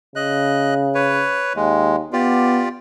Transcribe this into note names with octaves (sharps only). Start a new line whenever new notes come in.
C#3 D#5 F#6
B4 C#5
D#2 G#3
B3 F4 G4 D5